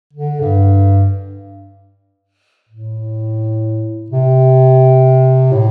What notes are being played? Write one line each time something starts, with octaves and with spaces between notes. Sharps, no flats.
D3
G2
A2
C3
A2